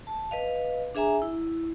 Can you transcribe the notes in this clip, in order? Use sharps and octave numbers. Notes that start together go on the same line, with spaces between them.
A5
B4 D#5 F5
D4 G#4 E5 G#5 A#5
E4